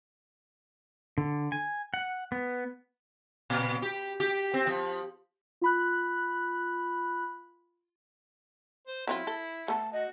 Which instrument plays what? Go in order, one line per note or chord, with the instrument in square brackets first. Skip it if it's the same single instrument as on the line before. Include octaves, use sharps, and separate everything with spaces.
[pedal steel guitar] D3
G#5
F#5
B3
[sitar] A#2
G4
G4
C4
F3
[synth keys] F4 B5 F#6
[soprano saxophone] C5
[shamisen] F#3 C4 F4 [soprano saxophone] E4
[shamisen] A4
[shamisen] A3 B3 [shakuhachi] A5
[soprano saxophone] F#4 [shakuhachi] D#5